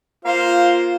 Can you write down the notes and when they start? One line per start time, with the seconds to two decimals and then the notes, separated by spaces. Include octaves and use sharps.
0.25 A#3 F4 C5 F5